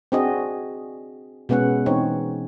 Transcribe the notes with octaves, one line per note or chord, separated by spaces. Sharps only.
C4 D4 F#4 G#4 D#5
B2 G#3 B3 C#4 F#5
E3 C4 D#4 C#5